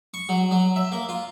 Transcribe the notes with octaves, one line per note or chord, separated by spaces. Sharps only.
C#6
F#3
F#3
E5
A#3
F4